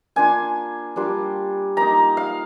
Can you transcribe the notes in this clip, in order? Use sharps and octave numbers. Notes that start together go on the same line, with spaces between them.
A#3 D4 F4 G#5
G3 A#3 D4 F4
A#3 D#4 A#5
F5